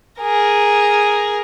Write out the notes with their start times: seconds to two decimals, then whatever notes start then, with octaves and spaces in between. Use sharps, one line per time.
0.20 G#4 A#4